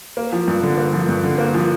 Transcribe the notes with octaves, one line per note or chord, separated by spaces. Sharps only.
A#3
F3
G2
D3
A#3
F3
G2
D3
A#3
F3